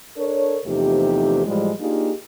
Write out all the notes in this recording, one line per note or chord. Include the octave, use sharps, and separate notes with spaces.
D4 A4 A#4 C#5
E2 C3 F3 A3 D#4 G4
A2 E3 F3 G3 G#3
A#3 D4 D#4 F4 G4 G#4